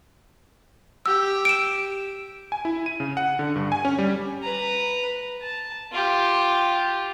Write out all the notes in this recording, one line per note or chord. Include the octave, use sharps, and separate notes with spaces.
G4 E6
D7 E7
G#5
E4
D#7
C#3
F#5
D3
G2
G#5
C#4
G3
B4 A#5
A5
F4 G4